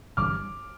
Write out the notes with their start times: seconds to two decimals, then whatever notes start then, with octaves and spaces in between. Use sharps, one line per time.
0.17 G1 G2 E3 G3 D6 F6